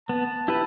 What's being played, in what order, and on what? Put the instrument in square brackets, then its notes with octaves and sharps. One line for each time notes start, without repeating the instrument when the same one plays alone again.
[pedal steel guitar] B3 [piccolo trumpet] A5
[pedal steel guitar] E4 G4 B4